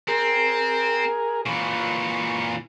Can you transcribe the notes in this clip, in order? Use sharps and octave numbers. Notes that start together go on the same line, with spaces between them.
C4 G#4 A#4
A#2 E3 C#6